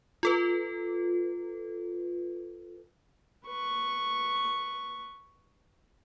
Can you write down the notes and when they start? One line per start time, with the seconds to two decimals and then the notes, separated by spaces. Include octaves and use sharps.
0.23 F4 A4 B4
3.46 B4 C#6